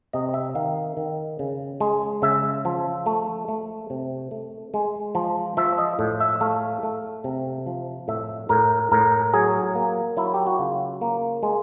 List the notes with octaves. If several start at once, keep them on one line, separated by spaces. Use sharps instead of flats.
C3 D#5
E5
D#3 F5
D#3
C#3
G#3
C#3 E5
F3
A3
A3
C3
A3
G#3
F3
F3 E5
D#5
A2
E5
A3 F5
A3
C3
F3
A2 E5
A2 A#4
A2 A#4
F#3 G#4
A#3
F#3 E4
G4
F#4
C#3 F4
A#3
G#3